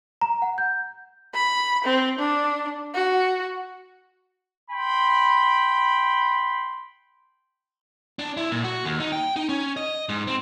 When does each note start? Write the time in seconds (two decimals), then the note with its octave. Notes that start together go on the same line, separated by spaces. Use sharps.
0.21 A#5
0.42 F#5
0.58 G6
1.34 B5
1.84 C4
2.19 D4
2.94 F#4
4.71 G5 B5 C6
8.19 D4
8.37 E4
8.52 A#2
8.64 F#4
8.85 D#2
9.00 D#4
9.12 G5
9.36 D#4
9.49 C#4
9.77 D#5
10.09 G#2
10.27 C4